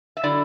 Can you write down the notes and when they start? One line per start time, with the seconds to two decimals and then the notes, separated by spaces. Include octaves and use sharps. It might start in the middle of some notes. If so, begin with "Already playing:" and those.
0.17 E5
0.23 D3 F#3 E4 D5